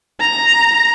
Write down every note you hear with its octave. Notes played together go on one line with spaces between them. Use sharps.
A#5